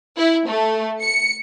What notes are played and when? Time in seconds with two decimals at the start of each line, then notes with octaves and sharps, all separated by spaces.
0.16 E4
0.47 A3
1.03 C#7